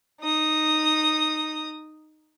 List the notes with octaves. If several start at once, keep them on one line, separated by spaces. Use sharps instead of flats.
D#4 D#6